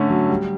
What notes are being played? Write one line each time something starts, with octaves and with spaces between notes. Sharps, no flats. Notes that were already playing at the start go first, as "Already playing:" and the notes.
Already playing: D3 A3 C#4
F#3
G3